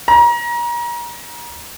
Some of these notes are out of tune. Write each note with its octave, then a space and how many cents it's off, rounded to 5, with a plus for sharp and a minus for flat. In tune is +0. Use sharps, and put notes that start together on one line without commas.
A#5 +35